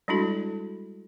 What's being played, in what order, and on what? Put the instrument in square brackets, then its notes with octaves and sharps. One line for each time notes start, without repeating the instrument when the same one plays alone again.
[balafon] G3 G#3 D4 E4 F#4 A4